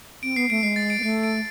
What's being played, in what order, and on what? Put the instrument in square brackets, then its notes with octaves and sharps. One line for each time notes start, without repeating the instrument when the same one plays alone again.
[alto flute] C4 [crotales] D7
[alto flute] B3 [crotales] C7
[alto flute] A3 [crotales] D7
[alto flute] G#3 [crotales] C7
[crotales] A6
D7
[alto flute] B3
[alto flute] A3 [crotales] C7
[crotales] D7